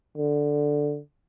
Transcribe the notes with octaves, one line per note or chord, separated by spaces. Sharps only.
D3